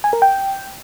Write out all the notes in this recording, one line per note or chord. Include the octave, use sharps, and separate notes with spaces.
G#5
A#4
G5